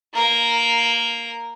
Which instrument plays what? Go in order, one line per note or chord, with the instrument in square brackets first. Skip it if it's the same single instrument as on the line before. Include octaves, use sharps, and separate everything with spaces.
[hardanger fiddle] A#3 A#4